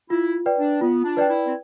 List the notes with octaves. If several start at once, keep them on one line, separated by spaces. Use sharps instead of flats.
E4 F4
B4 D5 G5
D4
B3 F4
D4
B4 D5 G5
E4
C4